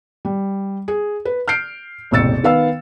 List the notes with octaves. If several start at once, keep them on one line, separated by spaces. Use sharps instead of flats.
G3
G#4
B4
F6 G6 C7 D7
E1 A1 C3 E6 A6 C#7
D#3 B3 F5 E6